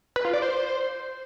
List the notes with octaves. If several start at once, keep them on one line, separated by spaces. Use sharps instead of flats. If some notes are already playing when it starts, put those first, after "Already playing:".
B4
F4
D5
C5